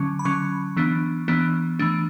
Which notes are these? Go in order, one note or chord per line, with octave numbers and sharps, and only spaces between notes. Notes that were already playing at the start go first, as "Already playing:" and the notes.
Already playing: D3 F#3 C#4 C#6
B5
D3 F#3 C#4 C#6
E3 B3 D4
E3 B3 D4
E3 A3 D4